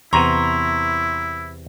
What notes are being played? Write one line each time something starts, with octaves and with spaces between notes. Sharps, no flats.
E2 C3 B3 E4 A#5 C6 C#6